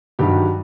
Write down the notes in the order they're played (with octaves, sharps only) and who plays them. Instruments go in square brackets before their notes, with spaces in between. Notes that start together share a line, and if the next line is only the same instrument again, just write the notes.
[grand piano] G2 D#3 F#3 G4